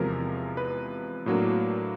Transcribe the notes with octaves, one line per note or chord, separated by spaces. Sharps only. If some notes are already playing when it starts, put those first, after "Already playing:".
Already playing: E2 C3 F3 G#3 A#4
B4
A2 F#3 A#3 D4